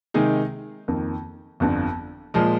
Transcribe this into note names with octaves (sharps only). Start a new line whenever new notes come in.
C3 D#3 G#3 D#4 G#4
F2 D#3 A#3
G1 F2 D3
A#2 F3 G#3